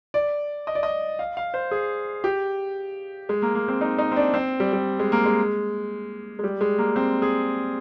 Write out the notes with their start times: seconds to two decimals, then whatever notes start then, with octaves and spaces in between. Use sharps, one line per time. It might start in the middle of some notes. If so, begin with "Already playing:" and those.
0.14 D5
0.67 D#5
0.75 D5
0.83 D#5
1.19 F5
1.37 F5
1.54 C5
1.71 G#4
2.24 G4
3.29 G#3
3.42 A#3
3.55 A#3
3.68 C4
3.81 D#4
3.98 D#4
4.12 C4
4.16 D4
4.34 C4
4.60 G3
4.73 G3
4.99 G#3
5.12 A#3
5.25 G#3
6.39 G#3
6.44 G3
6.61 G#3
6.78 A#3
6.96 C4
7.22 G#4